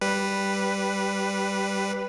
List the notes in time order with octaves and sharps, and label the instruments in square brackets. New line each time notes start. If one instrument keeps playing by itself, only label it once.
[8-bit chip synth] G3 B4